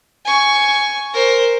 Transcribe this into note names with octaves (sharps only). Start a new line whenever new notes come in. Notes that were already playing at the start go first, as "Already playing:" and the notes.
G#5 C#6
A#4 C5